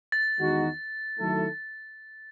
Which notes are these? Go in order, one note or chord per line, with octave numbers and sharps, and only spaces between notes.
A6
E2 D#3 G#3 D#4 F#4
D#3 F#3 A3 E4 A4